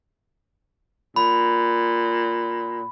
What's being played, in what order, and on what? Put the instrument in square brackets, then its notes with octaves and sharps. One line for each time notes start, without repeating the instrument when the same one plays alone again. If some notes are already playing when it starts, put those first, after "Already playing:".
[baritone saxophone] A#2 [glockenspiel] B5